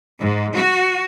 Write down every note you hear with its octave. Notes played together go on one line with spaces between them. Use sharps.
G#2
F#4